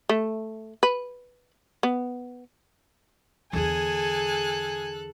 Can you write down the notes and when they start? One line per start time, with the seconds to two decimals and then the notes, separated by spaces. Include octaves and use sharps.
0.09 A3
0.83 B4
1.83 B3
3.53 E2 D3 G#4 A4 G#5 F#6